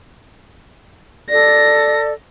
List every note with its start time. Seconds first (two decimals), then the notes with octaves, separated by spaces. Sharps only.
1.30 A4 D5 A#6